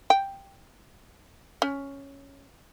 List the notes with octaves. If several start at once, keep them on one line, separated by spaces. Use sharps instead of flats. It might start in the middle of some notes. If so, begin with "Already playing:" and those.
G5
C#4